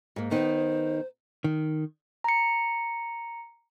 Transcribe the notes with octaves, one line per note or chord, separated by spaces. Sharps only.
G#2 A#3
D#3 B3 D#4 C5
D#3
A#5 C#7